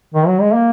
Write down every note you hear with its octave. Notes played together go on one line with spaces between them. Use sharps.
D#3
F#3
G#3
A#3